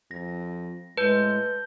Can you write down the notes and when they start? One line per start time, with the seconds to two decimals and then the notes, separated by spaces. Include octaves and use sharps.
0.11 F2 A#6
0.97 A2 G#3 B4 A5 G6 G7